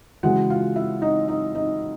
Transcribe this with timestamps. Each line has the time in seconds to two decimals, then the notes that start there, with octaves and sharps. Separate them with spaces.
0.23 C#3 E3 G#3 F#4 F#5
0.50 F4 F5
0.76 E4 E5
1.02 D#4 D#5
1.28 D#4 D#5
1.55 D#4 D#5